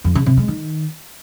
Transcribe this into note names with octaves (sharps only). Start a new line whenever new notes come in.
F2
C#3
C3
G#3
D#3